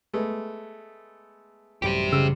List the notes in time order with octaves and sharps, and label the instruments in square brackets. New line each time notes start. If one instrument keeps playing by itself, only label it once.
[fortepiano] G#3 A3 B3
[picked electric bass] A1 F#2 G3 [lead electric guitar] G4 C5
[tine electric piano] C#3 [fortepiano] E6 F6